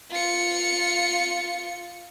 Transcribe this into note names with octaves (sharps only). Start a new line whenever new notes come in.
F4 C#7